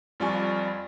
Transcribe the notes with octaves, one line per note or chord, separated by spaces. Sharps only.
F2 G3 F4 D5 G#5 C#6